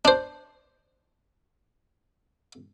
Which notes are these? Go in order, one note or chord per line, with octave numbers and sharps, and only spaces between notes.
D4 C5